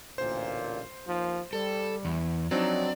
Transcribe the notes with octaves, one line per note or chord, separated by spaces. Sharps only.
A1 D2 A#2 C5
D#2 F3
G3 A4
E2
F3 F#3 C4 D4 D#4 D5